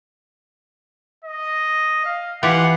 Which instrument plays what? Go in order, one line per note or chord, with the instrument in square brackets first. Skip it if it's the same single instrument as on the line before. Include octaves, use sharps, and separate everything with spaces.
[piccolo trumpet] D#5
F5
[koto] E3 F4 G4 [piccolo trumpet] F#5